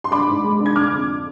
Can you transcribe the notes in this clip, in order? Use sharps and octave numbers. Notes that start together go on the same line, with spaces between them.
C6
D4 B5 D6
G#2
G#3
D4
G#6
D3 D6 F6
F2